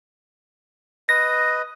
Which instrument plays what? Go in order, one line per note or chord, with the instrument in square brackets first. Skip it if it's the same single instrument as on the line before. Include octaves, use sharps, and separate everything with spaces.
[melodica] B4 D#5 [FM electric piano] A#6